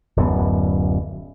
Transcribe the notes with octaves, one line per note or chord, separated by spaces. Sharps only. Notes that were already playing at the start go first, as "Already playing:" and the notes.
D1 F#2 B3